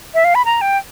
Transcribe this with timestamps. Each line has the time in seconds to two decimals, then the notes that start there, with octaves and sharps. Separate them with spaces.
0.14 E5
0.24 F5
0.35 B5
0.45 A#5
0.61 G5